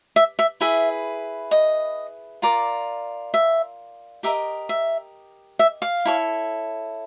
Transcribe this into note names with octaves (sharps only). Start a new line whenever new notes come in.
E5
E5
E4 G#4 B4 E5
D#5
F4 A#4 D5
E5
G4 A#4 D#5 E5
E5
E5
F5
E4 A4 C#5